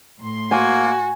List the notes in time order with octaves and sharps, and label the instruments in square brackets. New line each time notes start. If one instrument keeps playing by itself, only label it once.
[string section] A2 C6
[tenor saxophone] A#3 [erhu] F#4 [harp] G#5